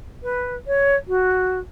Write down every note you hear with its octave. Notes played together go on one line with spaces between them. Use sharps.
B4
C#5
F#4